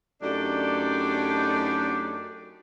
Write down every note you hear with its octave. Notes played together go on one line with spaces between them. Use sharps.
F#2 A3 D4 D#4 G4 D5